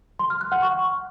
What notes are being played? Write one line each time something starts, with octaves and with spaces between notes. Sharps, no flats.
C6
F6
F#6
F#5
C#6